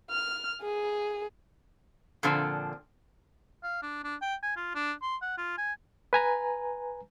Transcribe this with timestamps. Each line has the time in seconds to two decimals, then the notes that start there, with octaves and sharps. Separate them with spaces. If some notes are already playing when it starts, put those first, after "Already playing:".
0.11 F6
0.61 G#4
2.23 A#2 D3 F3 C4
3.63 F5
3.82 D4
4.04 D4
4.21 G5
4.43 G#5
4.56 F4
4.75 D4
5.02 C6
5.22 F#5
5.38 F4
5.57 G#5
6.13 B4 G#5 A#5